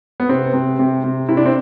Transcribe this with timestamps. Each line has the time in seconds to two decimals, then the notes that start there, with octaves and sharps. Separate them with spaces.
0.20 B3
0.29 C3 C4
0.53 C3
0.79 C3
1.04 C3
1.29 C3 E4
1.37 D4
1.46 C4